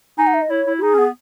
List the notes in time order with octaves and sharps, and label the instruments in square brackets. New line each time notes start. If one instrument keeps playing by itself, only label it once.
[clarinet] D#4 [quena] G#5
[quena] F#5
E5
D#5
[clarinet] E4 [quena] C#5
[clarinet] E4
[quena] F#4
[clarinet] D#4 [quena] G#4
[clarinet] C#4
B3